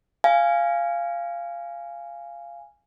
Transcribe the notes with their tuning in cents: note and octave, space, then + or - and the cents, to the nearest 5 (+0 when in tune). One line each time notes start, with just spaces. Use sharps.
F5 -15 G#5 -5